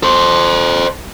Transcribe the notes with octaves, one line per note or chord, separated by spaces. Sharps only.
A4 C5